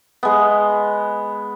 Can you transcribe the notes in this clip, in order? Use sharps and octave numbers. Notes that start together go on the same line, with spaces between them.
G#3 B3